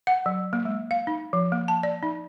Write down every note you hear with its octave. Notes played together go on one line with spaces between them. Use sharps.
F#5
F#3
A#3
G#3
F5
D#4
F3
A#3
A5
D5
D#4